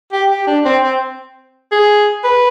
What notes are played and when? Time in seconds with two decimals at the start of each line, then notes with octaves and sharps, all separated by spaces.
0.13 G4
0.30 G4
0.47 D4
0.65 C4
0.83 C4
1.72 G#4
2.24 B4